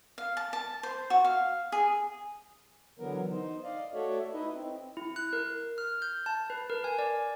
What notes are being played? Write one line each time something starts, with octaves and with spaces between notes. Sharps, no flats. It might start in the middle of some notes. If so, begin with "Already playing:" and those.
F5
A5
A5
C5
F#4
F5
G#4
D3 E3 F#3 B3 A#4
D#4 C5
D5 D#5 F5
A3 F#4 A4 C#5 D5 E5
D#4 E4 B4 D#5 E5
C4
E4
F#6
A#4
F6
G6
A5
B4
A#4
G#5
D5